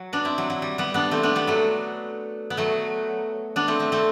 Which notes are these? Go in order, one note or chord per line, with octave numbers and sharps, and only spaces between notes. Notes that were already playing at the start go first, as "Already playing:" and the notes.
Already playing: F#3
B3 D4
C4 E4
F#3
F#3
G3
G3 B3
B3 D4
A3 C4
B3 D4
G3 B3
F#3 A3
B3
F#3 A3
B3 D4
A3 C4
A3 C4
A3 C4